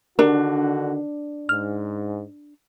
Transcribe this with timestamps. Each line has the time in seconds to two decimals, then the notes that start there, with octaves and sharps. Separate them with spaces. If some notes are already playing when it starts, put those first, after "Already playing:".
0.19 D3 D#3 D4 F#4 G4 A#4
1.49 G#2 F6